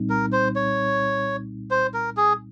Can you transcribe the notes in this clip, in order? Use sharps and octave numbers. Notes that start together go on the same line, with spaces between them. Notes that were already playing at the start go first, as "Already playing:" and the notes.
Already playing: C2 A#2 G3 C4 D#4
A#4
C5
C#5
C5
A#4
G#4